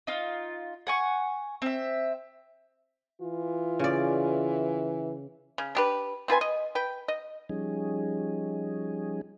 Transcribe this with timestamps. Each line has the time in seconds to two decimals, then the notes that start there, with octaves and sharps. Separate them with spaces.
0.07 D#4 F4
0.87 F#5 G#5 C#6
1.62 C4 E5
3.21 E3 F4
3.79 C#3 D5
5.58 C#3
5.75 D4 G4 B4
6.28 C4 F4 B4 G#5
6.41 D#5
6.75 B4 G5
7.08 D#5
7.49 F3 G3 C#4 D#4 G#4